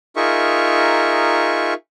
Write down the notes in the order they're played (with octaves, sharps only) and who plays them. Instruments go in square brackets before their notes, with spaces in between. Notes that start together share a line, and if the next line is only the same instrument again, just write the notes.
[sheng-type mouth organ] D#4 F4 G#4 A#4 E5 C#6